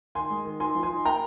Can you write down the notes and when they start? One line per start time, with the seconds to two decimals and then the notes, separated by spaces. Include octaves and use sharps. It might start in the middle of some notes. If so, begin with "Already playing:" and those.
0.15 D#3 G#5 C6
0.30 G#3
0.45 D#3
0.60 D#4 G#5 C6
0.75 F3
0.83 G#5 C6
0.90 D#4
1.05 A#3 G5 A#5